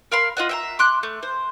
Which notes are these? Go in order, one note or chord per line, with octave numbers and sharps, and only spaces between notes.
A#4 F5 B5 C6
F4 D#5 F#5
E5 G5 A#5
C6 D6 F#6
A3
C5